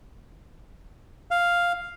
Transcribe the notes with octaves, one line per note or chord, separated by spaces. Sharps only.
F5